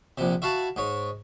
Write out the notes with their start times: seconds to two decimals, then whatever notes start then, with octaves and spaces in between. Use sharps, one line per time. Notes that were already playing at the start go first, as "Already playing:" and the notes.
0.18 A#1 C3
0.42 E4 F#4 F5 A5
0.76 G#2 C#5